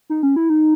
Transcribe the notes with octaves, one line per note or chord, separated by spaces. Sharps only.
D#4
C#4
E4
D#4